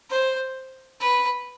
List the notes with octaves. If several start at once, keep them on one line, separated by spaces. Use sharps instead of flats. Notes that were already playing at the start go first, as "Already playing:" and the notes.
C5
B4